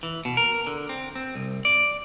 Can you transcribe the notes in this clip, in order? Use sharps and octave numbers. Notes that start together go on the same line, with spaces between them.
E3
B2
A#4
D3
C4
C4
C2
D5